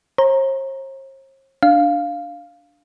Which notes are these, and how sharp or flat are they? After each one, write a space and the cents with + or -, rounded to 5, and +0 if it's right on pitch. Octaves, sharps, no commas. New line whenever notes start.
C5 +45 A#5 +0
D4 +0 F5 +0